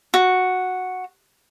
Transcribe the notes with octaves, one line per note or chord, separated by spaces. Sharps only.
F#4